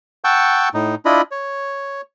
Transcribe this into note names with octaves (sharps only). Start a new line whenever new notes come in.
F#5 G5 A5 C#6 E6 G6
A2 D#4
D4 E4 F4 D#5 B5
C#5